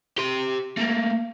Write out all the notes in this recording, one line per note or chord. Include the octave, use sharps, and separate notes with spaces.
G4 C6
A3 A#3